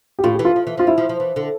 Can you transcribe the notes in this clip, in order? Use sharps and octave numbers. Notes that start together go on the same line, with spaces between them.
G4
A2 F4
G4
E3
F4
F3
E3
F3 F4
G3 E4
F3
F3
E3
D3